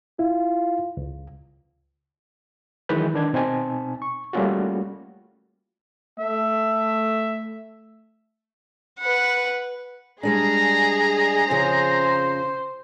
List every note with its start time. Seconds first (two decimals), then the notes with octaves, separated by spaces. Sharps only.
0.19 E4 F4
0.97 C#2
2.89 D#3 E3 F#3 G#3 B4 G6
3.14 D#3 D4 G#6
3.33 B2 C4 D#4 G#5 A5
4.02 C#6
4.33 G3 A3 A#3 C#4 F4 F#4
6.19 A3 E5
9.00 B4 F#5
10.23 G3 G#3 D4 G#4 A#5
11.50 F2 C#3 F3 C5